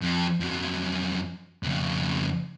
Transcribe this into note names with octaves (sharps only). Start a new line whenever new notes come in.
F2
F2 F#3
F2 C#3